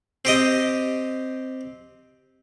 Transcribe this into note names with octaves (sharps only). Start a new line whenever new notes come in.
C4 G4 D#5